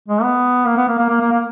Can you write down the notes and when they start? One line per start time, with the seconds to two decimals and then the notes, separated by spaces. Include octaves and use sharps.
0.08 G#3
0.23 B3
0.66 A#3
0.77 B3
0.88 A#3
0.98 A#3
1.09 A#3
1.20 A#3
1.31 A#3